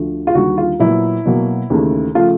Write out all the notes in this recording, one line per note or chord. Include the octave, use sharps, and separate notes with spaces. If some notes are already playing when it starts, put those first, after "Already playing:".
Already playing: D2 D3 F3 A3
F4
D#2 D3 G3 F#4
F4
A#2 F#3 B3 E4
B2 F#3 A#3
D#2 C#3 E3 A3
C#3 F3 A3 F4